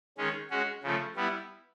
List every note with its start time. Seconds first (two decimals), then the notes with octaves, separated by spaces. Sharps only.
0.18 D#3 G#3 C#4
0.51 G#3 C#4 F#4
0.83 C#3 F3 A3
1.16 G3 B3 E4